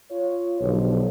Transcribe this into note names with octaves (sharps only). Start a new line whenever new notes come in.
F4 C#5
B1 D3 F3 G4